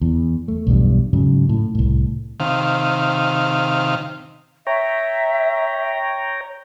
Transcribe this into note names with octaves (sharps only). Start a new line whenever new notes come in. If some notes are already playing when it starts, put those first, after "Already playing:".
E2
A3
B1 E2 G2
G#2 C#3 F#3
A2
C2 A2
C3 D#3 F5
C#5 E5 G5 A#5